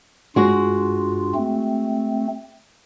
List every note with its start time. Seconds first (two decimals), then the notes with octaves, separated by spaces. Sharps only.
0.36 G2 G#3 F4 F#4
1.35 A3 C4